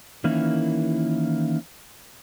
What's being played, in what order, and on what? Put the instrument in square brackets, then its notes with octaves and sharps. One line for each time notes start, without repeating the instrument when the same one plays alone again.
[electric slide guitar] D#3 E3 A#3 C#4 E4